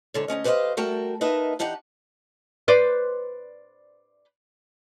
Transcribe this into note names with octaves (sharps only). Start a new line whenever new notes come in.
G#2 D3 C#5
D2 D#3 C#4 D#5
G4 B4 C5 D5 D#5 F5
G3 A3 F#4 A#4 G5 A5
A#3 D#4 B4 D#5 E5 A5
E3 D4 D#4 G4 F#5
B4 C5 D5